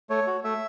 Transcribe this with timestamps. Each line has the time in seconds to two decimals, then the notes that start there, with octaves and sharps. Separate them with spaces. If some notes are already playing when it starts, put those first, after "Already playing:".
0.10 A3 C#5
0.27 F#4
0.44 A3 E5